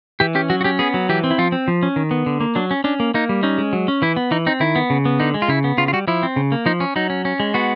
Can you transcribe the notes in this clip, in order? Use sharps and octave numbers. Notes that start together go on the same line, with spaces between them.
E3 G4
C#4 G4
F#3 F#4
F#4
C#4 G4
B3 G#4
F#3
E3 G4
C4
E4
F3 F4
C4
F3
C#4
D#3
B3
D3
A#3
F#3 D4
C#4
C#4 D4
A#3
A#3 D#4
G3
C#4 D#4
G#3
F#3
C#4
E3 E4
B3
E3 D#4
C4 D#4
D#3 E4
B3
C#3
B3
D3 D#4
G#3
F4
C#3 E4
B3
C#3 F4
F4
G3 F#4
F3 E4
C4
C#3
A#3
F3 D#4
C#4
F#3 D#4
C#4
C#4
G#3
B3 F#4